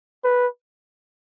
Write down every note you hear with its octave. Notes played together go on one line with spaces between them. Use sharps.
B4